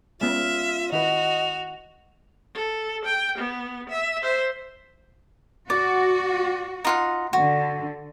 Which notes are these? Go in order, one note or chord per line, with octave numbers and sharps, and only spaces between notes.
G#3 B3 C#4 F4 E5 F6
D#3 E4 F#4 B4 D#5 F7
A4
G5
B3
E5
C5 E5
F#4 D5
D#4 F4 F#5
D3 F#4